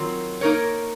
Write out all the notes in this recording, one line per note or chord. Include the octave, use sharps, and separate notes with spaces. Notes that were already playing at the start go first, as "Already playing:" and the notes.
Already playing: D#3 F#3 C4 F4 A#4
A#3 D#4 A#4 C#5